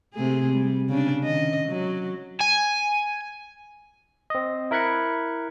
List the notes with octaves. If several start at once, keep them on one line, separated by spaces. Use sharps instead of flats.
C3 A3 G#4
G3
C#3 D4
D#3 D#5
F#3
G#5
C4 D#5
E4 A#4 B5 F#6 G#6 C#7